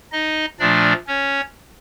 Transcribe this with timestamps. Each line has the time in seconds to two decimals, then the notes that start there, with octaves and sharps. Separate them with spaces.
0.12 D#4 D#5
0.59 A#2 F3 A3 D4 D5
1.08 C#4 C#5